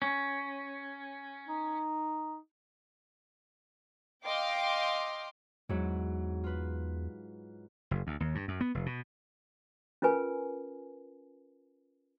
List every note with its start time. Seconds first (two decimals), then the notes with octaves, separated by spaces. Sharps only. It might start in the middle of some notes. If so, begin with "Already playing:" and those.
0.02 C#4
1.48 D#4
4.23 D#5 F5 G5 C6 D6
5.69 E2 G#2 F#3 E4
6.44 F4 B4
7.91 F#1
8.07 D2
8.20 D#2
8.35 G2
8.48 F#2
8.61 B3
8.74 F1
8.86 B2
10.02 C#4 F4 A#4 B4 G#5